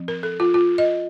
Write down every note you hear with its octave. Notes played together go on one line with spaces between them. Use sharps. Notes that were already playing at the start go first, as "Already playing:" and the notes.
Already playing: F3 C4
A#4
A4
F4
F4
D#5